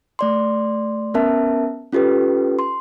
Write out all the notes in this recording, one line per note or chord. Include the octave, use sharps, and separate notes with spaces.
A3 D5 C6
B3 C#4 A#4 E5 A5
C#4 F4 G4 A4 B4
C6